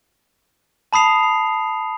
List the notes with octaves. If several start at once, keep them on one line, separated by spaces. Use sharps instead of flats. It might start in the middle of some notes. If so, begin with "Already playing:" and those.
A5 B5 D#6 C7 F7